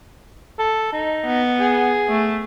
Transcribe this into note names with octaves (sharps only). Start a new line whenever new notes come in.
A4
D#4
B3
G#4
A3